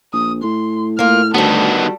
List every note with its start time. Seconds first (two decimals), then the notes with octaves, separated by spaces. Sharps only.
0.13 A#1 D#6
0.43 A2 C6
0.99 A#3 F4 F6
1.34 D2 D#3 G3 B3 F#4 A4